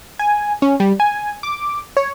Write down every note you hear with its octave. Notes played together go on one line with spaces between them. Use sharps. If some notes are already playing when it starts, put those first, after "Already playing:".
G#5
C#4
G3
G#5
D6
C#5